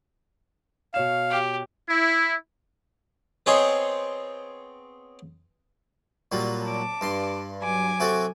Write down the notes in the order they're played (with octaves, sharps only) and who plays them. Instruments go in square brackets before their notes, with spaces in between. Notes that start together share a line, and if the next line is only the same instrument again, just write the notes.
[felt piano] B2 C#5 E7 [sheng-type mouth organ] F5
[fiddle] G4
[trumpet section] E4
[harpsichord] B3 C4 G#4 C5 C#5 D#5
A#2 F#3 G3
[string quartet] A5 D6
[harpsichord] G2 C6
[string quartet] F#3 G#5 D6
[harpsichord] C3 F#4 A4